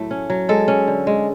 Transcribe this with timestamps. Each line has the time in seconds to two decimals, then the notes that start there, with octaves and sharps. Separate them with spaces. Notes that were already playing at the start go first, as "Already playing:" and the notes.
Already playing: A2 F#3 A3
0.11 C#4
0.30 F#3
0.49 G#3 A4
0.68 C#4
0.87 D3
1.07 G#3